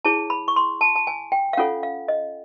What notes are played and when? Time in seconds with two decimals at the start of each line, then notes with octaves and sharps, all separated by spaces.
0.05 E4 G#4 C#5 A5
0.30 B5
0.48 C#6
0.56 C6
0.81 A5
0.95 A5
1.07 G#5
1.32 G5
1.53 F5
1.57 C#4 F4 A4 C#5 F#5
1.83 F5
2.08 D#5